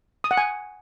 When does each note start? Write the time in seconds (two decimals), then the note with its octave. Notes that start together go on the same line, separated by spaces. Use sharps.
0.24 D#6
0.31 F#5
0.37 G#5